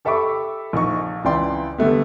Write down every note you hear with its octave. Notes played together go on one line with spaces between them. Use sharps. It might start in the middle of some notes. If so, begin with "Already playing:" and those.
G4 A4 E5 B5 C#6 D6
A#1 D#4 C#6
C#2 E3 E4 D5 G5 C6
D3 G3 A3 B3